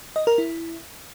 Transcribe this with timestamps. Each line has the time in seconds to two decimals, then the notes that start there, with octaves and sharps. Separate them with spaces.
0.16 D#5
0.27 A#4
0.38 E4